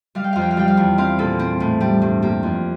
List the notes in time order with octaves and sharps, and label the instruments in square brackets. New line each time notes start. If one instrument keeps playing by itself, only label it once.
[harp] G3 F5
G5
F2 F5
G5
F5
G3 G5
F5
E2
C4 F5
A#2 A4
C4
A2
G3 G4
G2
A#3 G4
F2